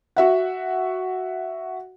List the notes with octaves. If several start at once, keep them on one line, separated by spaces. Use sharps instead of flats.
F#4 E5 F#5